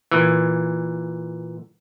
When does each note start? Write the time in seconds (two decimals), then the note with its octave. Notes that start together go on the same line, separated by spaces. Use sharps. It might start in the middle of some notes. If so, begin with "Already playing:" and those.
0.11 A#2 E3